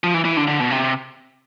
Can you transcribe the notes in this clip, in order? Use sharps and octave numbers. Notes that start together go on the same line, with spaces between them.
F3
E3
E3
D3
D3
B2
C3